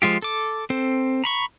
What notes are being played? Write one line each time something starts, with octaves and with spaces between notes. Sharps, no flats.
F3 G#3 F4 G4
A4 D6
C4 A4 C5
A#5 B5 C#6